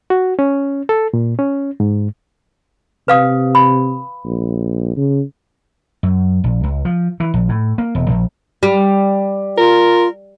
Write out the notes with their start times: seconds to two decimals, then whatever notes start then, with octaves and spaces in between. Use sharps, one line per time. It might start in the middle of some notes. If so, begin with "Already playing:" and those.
0.10 F#4
0.39 C#4
0.89 A4
1.13 A#2
1.39 C#4
1.80 G#2
3.08 C3 B4 F5 D#6
3.55 B5
4.25 A#1
4.97 C#3
6.03 F#2
6.44 A#1
6.64 C#2
6.85 F3
7.20 E3
7.34 A#1
7.49 A2
7.78 A#3
7.95 E1
8.10 A#1
8.63 G3
9.57 F4 A#4